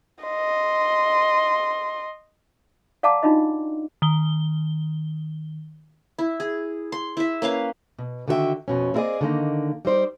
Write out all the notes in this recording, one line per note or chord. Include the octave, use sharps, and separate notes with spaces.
D#5 C6
D5 F5 F#5 A5 A#5 D6
D4 D#4 F4 F#4 D#5
D#3 G7
E4
G#4
C6
E4 E5
A#3 C#4 B4 F5
B2
D3 D#3 F#4 G#4 E5 G5
F2 B2 C#4
A#3 C4 E4 G#4 D5 D#5
D3 D#3 A#3 D#4
G3 D#4 C5 D5